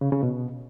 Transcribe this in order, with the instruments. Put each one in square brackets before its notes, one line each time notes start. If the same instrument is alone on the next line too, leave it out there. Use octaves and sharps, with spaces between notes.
[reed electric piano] C#3
C#3
B2